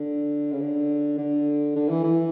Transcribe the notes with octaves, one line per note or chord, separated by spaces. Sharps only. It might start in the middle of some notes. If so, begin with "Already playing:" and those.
Already playing: D3
C#3
D3
D3
D3
E3
E3